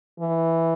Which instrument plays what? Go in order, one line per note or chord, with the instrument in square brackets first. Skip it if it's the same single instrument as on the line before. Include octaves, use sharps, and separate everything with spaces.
[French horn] E3